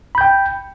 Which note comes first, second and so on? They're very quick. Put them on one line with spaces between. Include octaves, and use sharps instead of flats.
B5 G6 G5